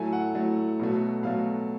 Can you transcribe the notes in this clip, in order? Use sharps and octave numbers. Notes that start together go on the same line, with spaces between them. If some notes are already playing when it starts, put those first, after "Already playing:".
Already playing: A2 F#3 A3 G#5
F#5
A2 F#3 A3
B2 F#3 A3
B2 F#3 A3 F5